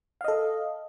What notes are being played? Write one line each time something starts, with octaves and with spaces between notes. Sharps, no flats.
A4 D#5 F5